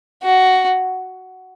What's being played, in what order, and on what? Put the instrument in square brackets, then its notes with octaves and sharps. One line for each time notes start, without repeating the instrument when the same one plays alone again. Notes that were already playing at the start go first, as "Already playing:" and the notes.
[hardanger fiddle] F#4